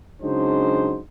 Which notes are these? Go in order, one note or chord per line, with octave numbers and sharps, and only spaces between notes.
C#3 F#3 G#3 D4 D#4 C5